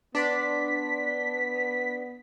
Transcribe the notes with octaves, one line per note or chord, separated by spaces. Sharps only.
B3 D4 D5 C6 B6